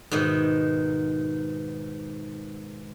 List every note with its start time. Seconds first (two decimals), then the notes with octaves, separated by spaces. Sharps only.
0.11 G#2 B2 D#3 E5